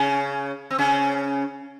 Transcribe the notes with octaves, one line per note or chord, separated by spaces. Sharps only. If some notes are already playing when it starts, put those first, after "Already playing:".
Already playing: C#3 C#4
C4
C#3 C#4